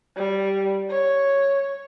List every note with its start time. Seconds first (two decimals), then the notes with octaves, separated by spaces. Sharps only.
0.17 G3
0.90 C#5